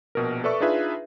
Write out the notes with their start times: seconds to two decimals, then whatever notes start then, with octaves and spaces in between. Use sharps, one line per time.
0.15 A#1 B2 A#4
0.44 A4 B4 D5 E5 C#6
0.60 D4 D#4 F4 G#4 B4 E5